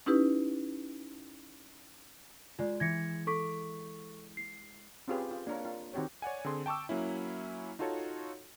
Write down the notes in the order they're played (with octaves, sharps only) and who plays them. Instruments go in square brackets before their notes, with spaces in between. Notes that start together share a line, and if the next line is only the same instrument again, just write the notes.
[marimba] C#4 D#4 E4 G4 B4
[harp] G#3 [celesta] F4 D5
[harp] E3 [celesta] G#6 A#6 C#7
[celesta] A4 C#6 B6 [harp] D6
[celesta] C7
[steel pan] C4 C#4 F4 G4 G#4 B4
F4
A#3 D4 A#4 C#5
F4
D#3 C4 F#4 G4 C#5
[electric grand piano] C#5 D5 F#5 G#5
D3 C4 G#4 C6
G5 A5 C#6 D6 E6
F#3 A#3 C#4 E4
D#4 F4 F#4 A4 C#5